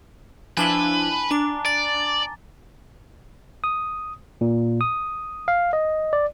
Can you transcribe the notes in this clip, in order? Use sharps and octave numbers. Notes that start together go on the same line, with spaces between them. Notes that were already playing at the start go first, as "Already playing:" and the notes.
F3 D4 E4 B4 G#5 A5 G7
D4 A#5 D6
D5 A6
D#6
A#2
D#6
F5
D#5
D5